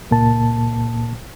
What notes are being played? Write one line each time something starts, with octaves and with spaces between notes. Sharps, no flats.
C#2 A#2 A#3 A5